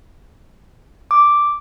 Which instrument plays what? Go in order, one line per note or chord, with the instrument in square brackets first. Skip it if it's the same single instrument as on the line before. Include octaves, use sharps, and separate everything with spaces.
[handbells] D6